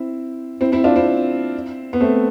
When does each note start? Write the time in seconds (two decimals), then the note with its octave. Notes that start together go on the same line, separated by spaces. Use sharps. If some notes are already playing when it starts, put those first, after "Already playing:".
Already playing: C4 E4
0.61 C4 E4
0.72 C4 E4
0.84 D4 F4
0.96 C4 E4
1.93 B3
2.00 A3 C4